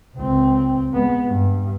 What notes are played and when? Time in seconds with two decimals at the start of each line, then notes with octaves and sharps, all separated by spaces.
0.16 C#2 C4
0.93 G#3 B3
1.27 G2